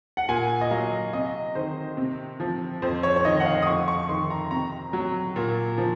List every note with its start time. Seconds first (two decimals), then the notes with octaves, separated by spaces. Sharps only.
0.17 F#5
0.29 A#2 G#5
0.61 D#5
0.71 F#3 F5
1.13 C3 D#5
1.55 D#3 C5
1.97 C3
2.40 F3
2.82 F2 C5
3.03 C#5
3.16 C#5
3.25 D#3 D#5
3.40 F#5
3.45 F5
3.62 D#6
3.66 F2 C#6
3.88 C#6
4.09 D#3 C6
4.30 A#5
4.51 C3 A#5
4.93 F#3
5.36 A#2
5.78 F3